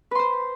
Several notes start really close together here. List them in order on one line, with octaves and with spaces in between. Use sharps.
B4 C6 C5